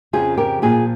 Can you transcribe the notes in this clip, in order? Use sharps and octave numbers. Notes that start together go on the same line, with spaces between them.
F2 C#3 F3 F4 G#4
G4 A#4
A#2 F3 F4 G#4